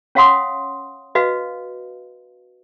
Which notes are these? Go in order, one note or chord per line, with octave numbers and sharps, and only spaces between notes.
C#4 C#5 F5 F#5 C6 D#6
F#4 B4 D#5 F5